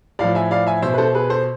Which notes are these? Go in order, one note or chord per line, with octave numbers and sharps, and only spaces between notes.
A2 F3 D5 F5
E5 G#5
D5 F5
E5 G#5
B2 C5 E5
B4
A4 C5
G#4 B4
A4 C5